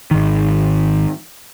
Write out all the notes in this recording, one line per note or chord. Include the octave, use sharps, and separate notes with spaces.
G#1 D#3